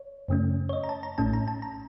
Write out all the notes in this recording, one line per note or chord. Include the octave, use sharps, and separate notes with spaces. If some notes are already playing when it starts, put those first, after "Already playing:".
Already playing: C#5
F#2 C#3 A3 C#4
C#5
D#5
A#5
A5
A#5
A1 A2 A3 C#4 A5
A#5
A5
A#5